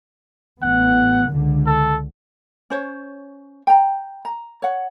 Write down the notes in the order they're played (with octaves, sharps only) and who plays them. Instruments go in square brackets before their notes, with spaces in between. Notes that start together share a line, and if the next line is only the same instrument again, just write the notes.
[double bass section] A1 B3 [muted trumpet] F#5
[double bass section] C#2 D3
[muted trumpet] A4
[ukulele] C#4 C5 C#5
G5 A#5
A#5
C#5 F#5